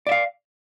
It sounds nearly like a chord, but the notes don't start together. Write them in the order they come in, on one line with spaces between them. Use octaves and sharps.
D5 E5 F5